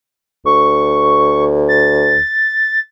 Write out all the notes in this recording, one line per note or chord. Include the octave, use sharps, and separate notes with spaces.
D2 C#6
A6